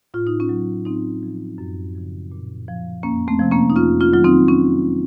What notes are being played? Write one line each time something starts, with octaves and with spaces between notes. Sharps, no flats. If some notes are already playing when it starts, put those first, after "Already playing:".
A2 F4
D#4
C#4 F4
F#3
A2 C4 D#4
F3
F#2
C#3 F3
A#2
F3
F2 A#3 C#4
A3 C4
C3 F3
A#3 C#4
D#4
F2 C#4 F4
C#4 F4
D#3 F#3 F4
C4 D#4
C#4